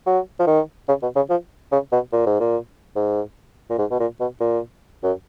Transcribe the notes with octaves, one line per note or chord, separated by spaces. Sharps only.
F#3
F3
D#3
C#3
B2
C#3
F3
C#3
B2
A#2
G#2
A#2
G#2
A#2
G#2
B2
A#2
B2
A#2
F#2